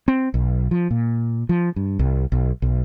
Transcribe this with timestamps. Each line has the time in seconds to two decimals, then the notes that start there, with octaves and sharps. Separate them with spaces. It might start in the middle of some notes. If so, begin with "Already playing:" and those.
0.08 C4
0.34 B1
0.71 F3
0.91 A#2
1.49 F3
1.76 G2
1.99 C2
2.32 B1
2.62 B1